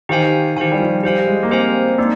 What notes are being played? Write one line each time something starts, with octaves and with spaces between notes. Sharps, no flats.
D#3 G4 C5 F5 G#5
D#3 G4 C5 F5 G#5
G3
F3
G3 G4 C5 F5 G#5
G#3
A#3
C4 G4 C5 F5 G#5
A#3 D4 D#4